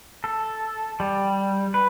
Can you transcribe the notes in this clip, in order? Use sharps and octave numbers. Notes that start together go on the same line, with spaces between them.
A4
G3
B4